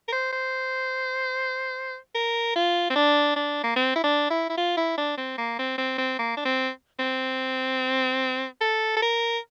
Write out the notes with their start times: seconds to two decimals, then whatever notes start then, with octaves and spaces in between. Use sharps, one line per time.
0.08 A#4
0.12 C5
0.33 C5
2.15 A#4
2.56 F4
2.90 C4
2.96 D4
3.36 D4
3.64 A#3
3.76 C4
3.95 E4
4.04 D4
4.30 E4
4.50 E4
4.57 F4
4.77 E4
4.98 D4
5.17 C4
5.38 A#3
5.59 C4
5.78 C4
5.98 C4
6.19 A#3
6.37 D4
6.45 C4
6.99 C4
8.61 A4
8.96 A4
9.02 A#4